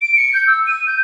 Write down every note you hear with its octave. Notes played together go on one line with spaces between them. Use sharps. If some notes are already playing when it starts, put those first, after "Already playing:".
D7
C#7
G6
E6
D#7
G6